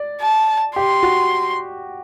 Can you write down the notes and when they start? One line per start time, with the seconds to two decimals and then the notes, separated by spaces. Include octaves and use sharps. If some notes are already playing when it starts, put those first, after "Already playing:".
Already playing: D5
0.21 A5
0.76 G4 C6
1.03 F#4